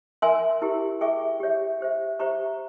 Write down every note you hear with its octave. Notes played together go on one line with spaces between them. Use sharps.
A#4 E5 G#5 C6
E4 G4 A#4
G#4 E5 G5 C#6
G4 C#5 E5
G4 C5 E5
G4 C5 E5 A#5 C#6